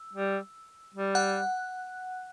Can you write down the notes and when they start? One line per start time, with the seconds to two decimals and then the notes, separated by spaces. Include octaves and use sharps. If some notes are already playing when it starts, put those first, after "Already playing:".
Already playing: E6
0.13 G3
0.94 G3
1.15 F#5 F#6